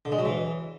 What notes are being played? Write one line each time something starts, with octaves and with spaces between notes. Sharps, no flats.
D3
G#3
F#3
E3